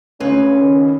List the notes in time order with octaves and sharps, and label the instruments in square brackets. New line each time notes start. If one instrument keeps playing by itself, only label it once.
[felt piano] C#2 C#3 [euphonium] A3 [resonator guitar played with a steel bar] C4 B4 C#5 [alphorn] C#4
[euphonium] D#3